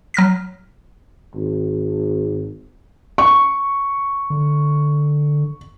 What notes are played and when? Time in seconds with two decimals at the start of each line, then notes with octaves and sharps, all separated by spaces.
0.14 F#3 F6 A#6 B6
1.35 G#1
3.18 C#6
4.30 D3